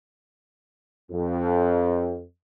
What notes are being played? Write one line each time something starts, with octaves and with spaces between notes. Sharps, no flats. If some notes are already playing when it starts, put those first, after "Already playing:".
F2